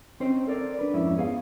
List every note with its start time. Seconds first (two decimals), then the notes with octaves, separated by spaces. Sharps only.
0.20 C4 C#4 D#4 C5
0.47 A4 A#4 D5
0.79 D4 B4
0.94 F2 G#2 C#4 E4
1.17 B3 G#4 C5 F5